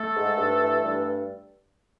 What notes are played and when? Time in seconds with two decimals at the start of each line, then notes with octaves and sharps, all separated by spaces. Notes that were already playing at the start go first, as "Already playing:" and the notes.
Already playing: A3 A4
0.16 G#2
0.37 G2
0.60 E3
0.82 G2